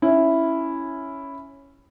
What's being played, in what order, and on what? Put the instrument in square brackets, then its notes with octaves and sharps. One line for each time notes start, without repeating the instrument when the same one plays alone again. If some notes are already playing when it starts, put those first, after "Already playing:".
[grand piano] C#4 E4